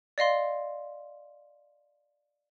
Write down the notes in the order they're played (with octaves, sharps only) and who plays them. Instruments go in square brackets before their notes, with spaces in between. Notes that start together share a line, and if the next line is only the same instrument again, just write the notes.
[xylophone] D5 D#5 F5 C6